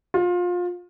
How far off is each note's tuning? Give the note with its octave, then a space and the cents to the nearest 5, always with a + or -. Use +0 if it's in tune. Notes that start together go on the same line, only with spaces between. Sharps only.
F4 +25